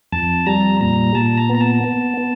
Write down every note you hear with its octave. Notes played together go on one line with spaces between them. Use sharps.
F2 A5
G3 A#5
A#2 A#5
A#2 A5
A#5
B3
A#5
A5
B3
B3